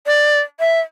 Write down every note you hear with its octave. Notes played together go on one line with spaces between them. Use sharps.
D5
E5